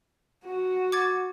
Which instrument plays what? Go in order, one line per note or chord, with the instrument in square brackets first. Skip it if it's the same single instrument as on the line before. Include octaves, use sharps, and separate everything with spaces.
[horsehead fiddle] F#4
[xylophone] D6 G#6 A6